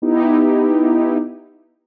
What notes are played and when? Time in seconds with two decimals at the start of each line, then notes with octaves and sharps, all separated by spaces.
0.02 B3 D#4 E4 G4